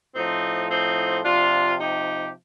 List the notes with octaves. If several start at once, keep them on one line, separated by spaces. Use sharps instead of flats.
A2 F3 C4 D#4
C4 D#4
C3 F3 D4 F4
D#4 G4